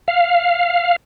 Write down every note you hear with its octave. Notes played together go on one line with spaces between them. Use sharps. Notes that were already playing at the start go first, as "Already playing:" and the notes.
F5